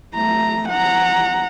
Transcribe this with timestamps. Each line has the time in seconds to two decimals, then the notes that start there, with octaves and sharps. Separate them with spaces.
0.15 A3 A#5
0.69 F#5 A#5